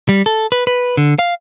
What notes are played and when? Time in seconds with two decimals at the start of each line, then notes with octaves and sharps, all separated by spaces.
0.09 G3
0.26 A4
0.52 B4
0.67 B4
0.97 D3
1.19 F5